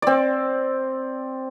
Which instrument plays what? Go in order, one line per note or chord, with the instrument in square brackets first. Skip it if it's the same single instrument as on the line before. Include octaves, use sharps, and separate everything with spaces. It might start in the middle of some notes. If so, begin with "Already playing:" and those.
[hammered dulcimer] C4 D5